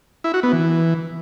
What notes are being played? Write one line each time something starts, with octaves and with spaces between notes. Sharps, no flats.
E4
F#4
B3
E3